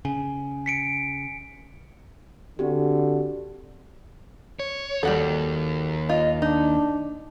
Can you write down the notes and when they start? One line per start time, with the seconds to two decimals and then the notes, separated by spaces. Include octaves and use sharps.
0.05 C#3 G#5
0.66 B6 C#7 D7
2.59 D3 C4 F#4 G4
4.60 C#5
5.03 D#2 G3 F#4 A4
6.09 F4 D#5
6.42 D4 D#4